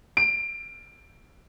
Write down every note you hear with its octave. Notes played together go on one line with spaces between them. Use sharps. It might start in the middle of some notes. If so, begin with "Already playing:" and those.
D7